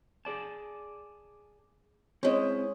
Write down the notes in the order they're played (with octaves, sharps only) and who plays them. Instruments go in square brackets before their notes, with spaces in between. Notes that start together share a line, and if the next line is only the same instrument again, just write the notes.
[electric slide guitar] G#4 D5 A5
[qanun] G#3 C#4 [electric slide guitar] C4 E4